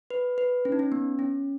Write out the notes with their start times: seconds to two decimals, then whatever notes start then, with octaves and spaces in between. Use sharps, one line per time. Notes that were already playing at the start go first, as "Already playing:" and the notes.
0.10 B4
0.38 B4
0.65 C#4
0.72 D#4
0.79 C#4
0.92 B3
1.19 C#4